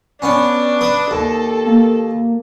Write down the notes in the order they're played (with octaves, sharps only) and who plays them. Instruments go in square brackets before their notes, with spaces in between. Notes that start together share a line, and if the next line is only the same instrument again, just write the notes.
[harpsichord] B3 C#4 [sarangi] D4
[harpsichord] B4 D#6
[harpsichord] D#2 [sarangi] A4
[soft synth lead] A#3